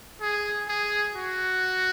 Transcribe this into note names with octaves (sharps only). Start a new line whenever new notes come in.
G#4
G#4
F#4